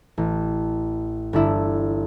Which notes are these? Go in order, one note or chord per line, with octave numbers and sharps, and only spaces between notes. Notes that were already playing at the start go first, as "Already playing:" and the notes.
A1
G1 D4 E4 E7